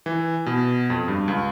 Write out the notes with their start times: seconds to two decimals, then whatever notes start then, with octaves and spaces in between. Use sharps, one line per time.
0.06 E3
0.46 B2
0.90 F2
1.08 G2
1.28 C#2